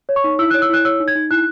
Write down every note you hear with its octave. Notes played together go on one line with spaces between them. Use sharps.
C#5
C#6
D#4
E4 E6
F#6
C#5
E6
E4 F#6
C#5 E6
D#4
G#6
D#4
E4 F#6